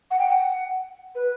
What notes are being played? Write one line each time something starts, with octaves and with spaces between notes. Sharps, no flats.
F#5
G5
F#5
B4